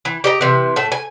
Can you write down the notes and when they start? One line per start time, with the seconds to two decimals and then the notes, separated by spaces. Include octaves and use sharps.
0.05 E3
0.24 G4 D#5 A#5
0.41 C3 E3
0.76 A2 A4
0.92 G#5